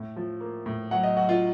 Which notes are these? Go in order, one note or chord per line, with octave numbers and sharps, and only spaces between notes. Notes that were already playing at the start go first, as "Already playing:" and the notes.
Already playing: A2
F3
A#3
A2
F#3 F#5
D#5
F#3 F#4
F4